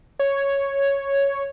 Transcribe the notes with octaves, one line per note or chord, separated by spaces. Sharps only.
C#5